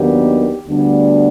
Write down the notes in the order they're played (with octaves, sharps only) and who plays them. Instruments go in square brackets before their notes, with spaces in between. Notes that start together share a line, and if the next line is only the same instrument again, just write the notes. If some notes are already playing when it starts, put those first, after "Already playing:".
Already playing: [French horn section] D#2 D#3 F#3 B3 D4 G4
D2 D3 G3 B3 D4